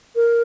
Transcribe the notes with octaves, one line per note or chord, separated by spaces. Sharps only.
A#4